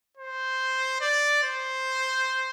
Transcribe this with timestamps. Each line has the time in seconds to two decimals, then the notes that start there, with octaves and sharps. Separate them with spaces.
0.17 C5
1.01 D5
1.43 C5